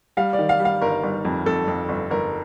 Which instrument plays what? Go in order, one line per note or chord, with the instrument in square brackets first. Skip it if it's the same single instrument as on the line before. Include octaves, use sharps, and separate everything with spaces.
[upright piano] G3 F5
D5
D#3
F5
G3
F5
G1 A#4
G1
F2
F2 A4
F2
G1
G1 A#4